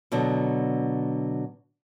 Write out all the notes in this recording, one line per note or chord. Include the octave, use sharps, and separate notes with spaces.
B2 D3 F#3 B3